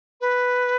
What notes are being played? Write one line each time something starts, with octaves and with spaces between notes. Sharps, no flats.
B4